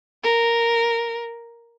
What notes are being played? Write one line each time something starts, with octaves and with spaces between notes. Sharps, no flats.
A#4